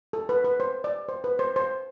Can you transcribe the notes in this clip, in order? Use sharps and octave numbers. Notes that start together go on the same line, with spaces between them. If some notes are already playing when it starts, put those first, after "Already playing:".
A4
B4
B4
C5
D5
C5
B4
C5
C5